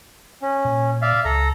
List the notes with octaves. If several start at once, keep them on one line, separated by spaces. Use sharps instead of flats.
C#4
A#2
D5 E5 F5
C#2 A4 A#5